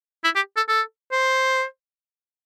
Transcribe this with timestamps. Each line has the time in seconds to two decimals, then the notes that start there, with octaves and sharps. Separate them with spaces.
0.24 E4
0.35 G4
0.56 A4
0.68 A4
1.12 C5